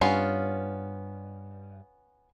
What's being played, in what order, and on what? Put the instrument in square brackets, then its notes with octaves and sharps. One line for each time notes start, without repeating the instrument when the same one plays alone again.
[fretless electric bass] G2 [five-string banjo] B3 C#4 F4